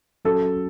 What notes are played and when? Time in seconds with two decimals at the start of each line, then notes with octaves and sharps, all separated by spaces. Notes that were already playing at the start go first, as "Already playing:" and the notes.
0.25 F#3 C#4 F#4 A4